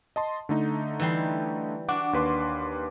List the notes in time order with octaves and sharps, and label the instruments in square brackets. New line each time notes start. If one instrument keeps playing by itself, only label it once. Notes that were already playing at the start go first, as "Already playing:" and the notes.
[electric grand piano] D#5 A5 C6
D3 A3 D#4
[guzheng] E3 G3 C6
[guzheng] D4 F#4 [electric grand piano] F#5 D6
[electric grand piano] D#2 B4 C6